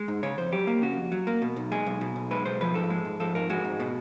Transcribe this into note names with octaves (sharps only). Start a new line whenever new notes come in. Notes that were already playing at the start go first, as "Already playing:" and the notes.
Already playing: G#3
G#2
C#3 C#5
F2 C5
F#3 G4
A#3
C#3 F#4
F2
F#3
A#3
B2
B1
G#3 G#4
B1
B2
B1
G#3 B4
B1 C5
F3 B4
G#2 A4
G#3
G#2
F3 A4
G#2 A#4
G#3 F#4
G#2
B2